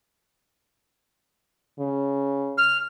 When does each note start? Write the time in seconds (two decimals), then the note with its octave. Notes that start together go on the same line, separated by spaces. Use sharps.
1.79 C#3
2.58 F6